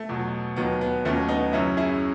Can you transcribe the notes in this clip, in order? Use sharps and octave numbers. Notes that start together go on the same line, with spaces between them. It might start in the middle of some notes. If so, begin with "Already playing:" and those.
Already playing: A3
E2 B2 F#3
D#2 D#3 F#3 B3
B3
D#2 D#3 F#3 A3 C#4
B3 D#4
F#2 C#3 F#3 C#4 E4
E4 G#4